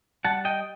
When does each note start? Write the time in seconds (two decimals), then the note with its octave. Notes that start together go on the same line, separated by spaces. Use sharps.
0.25 G3 F#5 A5
0.45 D#5 G5